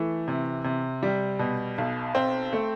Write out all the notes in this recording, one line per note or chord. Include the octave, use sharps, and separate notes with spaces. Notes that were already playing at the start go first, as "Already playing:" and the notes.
Already playing: E3 A3
C3
C3
G3
B2
B1
C4
A3